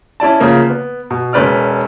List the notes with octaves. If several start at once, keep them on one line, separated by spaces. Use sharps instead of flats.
C#4 E4 D5 A5
D2 C#3 F3 A#3
B3
B2
E1 C#4 B4 D5 F6